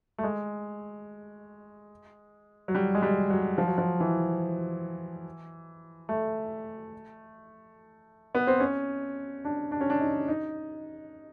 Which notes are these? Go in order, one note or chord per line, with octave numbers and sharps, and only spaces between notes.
A3
G#3
F#3
G3
G#3
G3
F#3
F3
F#3
F3
E3
A3
B3
C4
C#4
D4
D4
C#4
D4
D#4
D#4